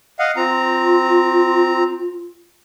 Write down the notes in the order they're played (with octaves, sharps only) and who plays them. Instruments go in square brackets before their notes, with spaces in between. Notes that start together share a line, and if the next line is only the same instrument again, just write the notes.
[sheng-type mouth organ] D#5 F5 F#5
[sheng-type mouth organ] C4 A#5 [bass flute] F4